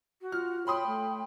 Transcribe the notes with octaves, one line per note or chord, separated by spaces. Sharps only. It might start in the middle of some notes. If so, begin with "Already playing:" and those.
F#4
F4 F6
C#5 G5 B5 C6 D#6
A3